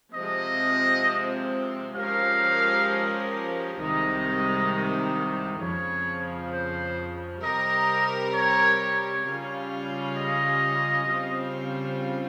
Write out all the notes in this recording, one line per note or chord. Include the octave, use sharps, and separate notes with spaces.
C3 F3 G#3 C4 D#5
F3 G#3 C#4 G4 A#4 F5
C2 C3 D#3 G#3 D#4 D#5
F2 C#3 F3 C#5
C5
C3 G3 C4 G4 A#4 D#5
C#5
C#3 G3 C#4 F4
D#5
C#3 G3 C4 F4